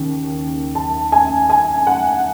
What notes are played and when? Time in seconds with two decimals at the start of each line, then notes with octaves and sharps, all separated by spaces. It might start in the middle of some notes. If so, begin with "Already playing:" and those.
Already playing: D#2 C#3
0.75 A5
1.12 G#5
1.50 G#5
1.87 F#5